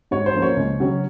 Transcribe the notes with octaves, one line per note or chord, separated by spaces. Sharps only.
G#2 C#5
C5
F3 A#3 C#4
C#5
C#2
C#3 F#3 C#4